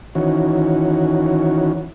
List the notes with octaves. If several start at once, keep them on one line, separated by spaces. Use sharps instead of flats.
D#3 E3 C#4 F#4